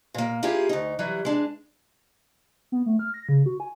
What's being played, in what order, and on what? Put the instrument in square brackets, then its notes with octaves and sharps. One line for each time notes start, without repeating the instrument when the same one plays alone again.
[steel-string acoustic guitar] A#2 A#3
A#3 E4 F4 G4 G#4
D2 D#4
E3 F#3 G3
G#3 D4
[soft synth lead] B3
A3
F6
A#6
C#3
F#4
G#5